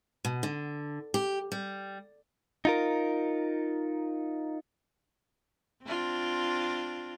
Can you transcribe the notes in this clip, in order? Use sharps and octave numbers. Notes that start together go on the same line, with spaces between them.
B2
D3
G4
G3
D#4 F4 A#4
C4 D4 F4